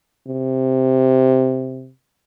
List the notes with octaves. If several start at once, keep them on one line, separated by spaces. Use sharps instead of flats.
C3